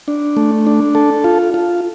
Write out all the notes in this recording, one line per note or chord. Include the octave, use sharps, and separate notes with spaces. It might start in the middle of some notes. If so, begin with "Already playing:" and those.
D4
A3
D4
A4
F4
F4